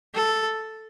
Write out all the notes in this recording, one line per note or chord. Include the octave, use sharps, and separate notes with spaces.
A4